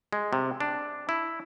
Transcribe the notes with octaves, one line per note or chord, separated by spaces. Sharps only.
G#3
C3
D4
E4